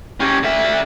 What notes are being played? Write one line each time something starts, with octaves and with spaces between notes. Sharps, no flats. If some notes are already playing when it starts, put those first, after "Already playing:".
C#4 G4
D3 E5